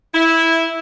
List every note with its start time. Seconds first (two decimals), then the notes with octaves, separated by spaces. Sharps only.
0.14 E4